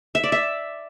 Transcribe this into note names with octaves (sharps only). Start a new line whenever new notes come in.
E5
D5
E5